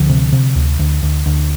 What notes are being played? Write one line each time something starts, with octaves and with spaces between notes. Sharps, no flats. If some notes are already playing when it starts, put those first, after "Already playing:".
Already playing: D2 D3 F3
C3
C3
D2
D2
D2
D2